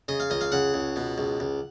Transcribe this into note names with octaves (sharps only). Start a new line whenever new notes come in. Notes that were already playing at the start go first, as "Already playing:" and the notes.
C#3 D#5
F5
C#2 D#5
F5
C#3 F#5
C#2
B2
C#2
C#2